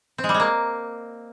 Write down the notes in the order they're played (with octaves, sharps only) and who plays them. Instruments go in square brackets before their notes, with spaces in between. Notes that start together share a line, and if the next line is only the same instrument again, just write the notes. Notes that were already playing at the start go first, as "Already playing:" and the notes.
[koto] C4
G#3
G3
G#3
A#3